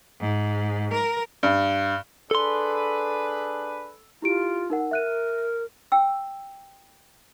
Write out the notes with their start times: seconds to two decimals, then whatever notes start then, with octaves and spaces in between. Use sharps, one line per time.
0.19 G#2
0.93 A#4
1.43 G2
2.31 D4 G#4 A4 B4 C6
4.22 E4 F4 G4 D7
4.70 D#4 A#4 F#5
4.91 A#4 E5 F#6 D#7
5.92 G5 E6